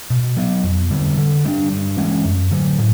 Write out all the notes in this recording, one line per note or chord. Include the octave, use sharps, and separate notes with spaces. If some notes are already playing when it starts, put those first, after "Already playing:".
B2
F#3 B3
F2
D3 G3 C4
D3
G3 B3 D4
G2
E3 G#3 C#4
F#2
D3 F#3
A2